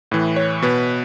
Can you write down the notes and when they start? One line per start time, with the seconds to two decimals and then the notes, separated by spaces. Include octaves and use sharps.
0.11 A2 E3
0.36 C#5
0.62 B2 B4